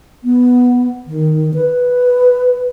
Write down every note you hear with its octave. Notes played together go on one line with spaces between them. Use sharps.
B3
D#3
B4